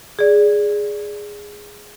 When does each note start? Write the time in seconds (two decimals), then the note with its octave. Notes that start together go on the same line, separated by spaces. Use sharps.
0.19 G#4 D5